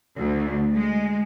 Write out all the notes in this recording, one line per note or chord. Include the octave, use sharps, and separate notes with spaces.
D2
G#3